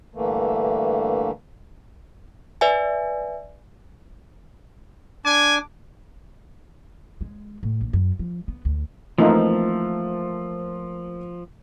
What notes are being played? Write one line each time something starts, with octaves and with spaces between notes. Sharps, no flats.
G2 D3 E3 A3 A#3
B4 D5 E5 G#5
D4 G#5 D6
G#3
A2
A#1
F#2
F3
B3
D2
E3 F3 A3 A#3 C4 D#4 F4